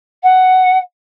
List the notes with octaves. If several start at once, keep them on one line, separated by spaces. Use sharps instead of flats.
F#5